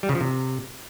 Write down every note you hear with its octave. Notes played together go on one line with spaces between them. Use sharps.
G3
C#3
F3
C3